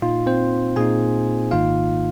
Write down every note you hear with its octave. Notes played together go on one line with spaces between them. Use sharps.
A#2 A#3 D#4 F4
C4 C5
A#2 A#3 D#4 G#4 G#5
G#1 G#2 D#3 A#3 D#4 F4 F5